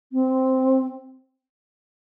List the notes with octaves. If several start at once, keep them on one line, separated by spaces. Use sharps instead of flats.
C4